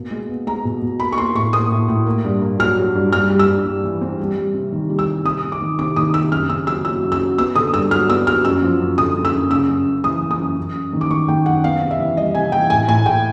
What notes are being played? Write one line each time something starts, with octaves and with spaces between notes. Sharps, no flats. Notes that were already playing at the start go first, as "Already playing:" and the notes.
Already playing: B2 A#3
G#3
B3
G#3 A#5
B2
B2
A#3 B5
C#6
A#3 C6
A2 C#6
A#3 D#6
A2
A2
A#3
G2
A#3
F#3 F6
F#3
G2
G2 F6
G3
E6
G2
G3
E3
C4
G3
G3
C3
D#3
G3
E6
G3
C3 D#6
C3
D6
D#3
C3 D6
D#3 D#6
C3 E6
F#2 F6
C#3 E6
F#3 E6
F#3 E6
F#2
E6
F#3
B3 E6
D3 D#6
G2 E6
F#3 F6
B3 E6
F#3 F6
F#2 E6
F3
F#2
D3 D#6
F#2
E6
F#2
C#3 E6
F#2
F#2
E3 D#6
E3
D#6
F#2
F#2
F#2
D#3
D6
D#3 C#6
D#3 G5
F#2 F#5
B3 F5
C3
E5
E3
G3 D#5
C3 G#5
E3 G5
A2 G#5
A2 G#5
A2 G5